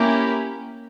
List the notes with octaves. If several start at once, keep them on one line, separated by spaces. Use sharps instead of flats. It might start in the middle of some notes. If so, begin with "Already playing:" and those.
Already playing: A#3 C#4 E4 G4 A#4